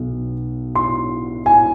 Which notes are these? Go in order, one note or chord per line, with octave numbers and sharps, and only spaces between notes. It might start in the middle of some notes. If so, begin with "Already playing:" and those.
Already playing: B1 B2
C6
G#5